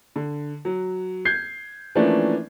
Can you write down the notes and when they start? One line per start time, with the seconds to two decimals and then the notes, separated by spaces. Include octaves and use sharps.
0.16 D3
0.65 F#3
1.25 G6 G#6 C7
1.95 E3 F3 A3 A#3 C#4 D4